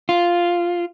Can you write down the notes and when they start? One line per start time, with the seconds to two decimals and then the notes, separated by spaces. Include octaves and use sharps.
0.09 F4